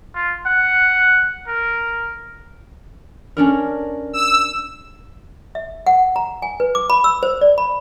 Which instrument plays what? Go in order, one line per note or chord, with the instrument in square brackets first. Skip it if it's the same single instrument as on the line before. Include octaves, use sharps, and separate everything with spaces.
[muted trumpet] F4
F#5
A#4
[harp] C#4 D4 A#4
[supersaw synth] E6
[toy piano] E5
F#5
A#5
G#5
B4
D6
B5
E6
C5
D5
B5